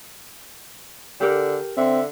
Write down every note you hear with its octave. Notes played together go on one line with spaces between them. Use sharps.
D3 G4 A4 A#4
D3 C4 E5